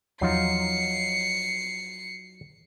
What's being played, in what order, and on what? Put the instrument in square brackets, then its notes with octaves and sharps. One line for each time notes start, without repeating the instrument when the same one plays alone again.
[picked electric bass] E2 F3 [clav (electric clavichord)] F#3 D#4 F4 [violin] C7 C#7